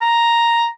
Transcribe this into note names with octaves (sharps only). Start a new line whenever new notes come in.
A#5